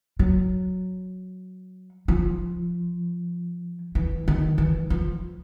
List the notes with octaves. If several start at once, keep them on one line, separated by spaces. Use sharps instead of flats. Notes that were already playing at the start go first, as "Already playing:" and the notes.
F#3
F3
E3
D#3
E3
F3